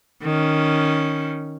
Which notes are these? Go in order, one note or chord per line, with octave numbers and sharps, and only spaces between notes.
D#3 C#4